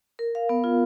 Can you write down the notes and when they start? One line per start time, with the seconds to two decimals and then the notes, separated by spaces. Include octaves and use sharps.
0.19 A#4
0.35 F5
0.49 B3
0.64 F4